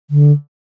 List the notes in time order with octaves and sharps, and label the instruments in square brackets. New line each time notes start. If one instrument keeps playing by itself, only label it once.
[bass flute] D3